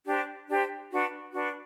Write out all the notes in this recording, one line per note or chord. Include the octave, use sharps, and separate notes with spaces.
D4 G4 C5
D4 G4 C5
D4 F#4 B4
D4 F#4 B4